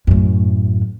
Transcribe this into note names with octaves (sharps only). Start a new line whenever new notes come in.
F#2 A2